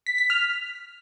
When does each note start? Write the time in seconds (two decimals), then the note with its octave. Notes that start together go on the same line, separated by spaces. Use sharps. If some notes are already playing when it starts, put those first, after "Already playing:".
0.06 B6
0.18 B6
0.30 F6